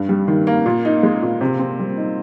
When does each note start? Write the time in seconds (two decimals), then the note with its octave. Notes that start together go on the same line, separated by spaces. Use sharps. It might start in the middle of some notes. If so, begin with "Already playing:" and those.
Already playing: G2
0.09 G3
0.28 D#3
0.47 A#3
0.66 A#2
0.85 D#4
1.03 G#3
1.23 A#2
1.41 C3
1.59 C4
1.79 G3
1.97 D#4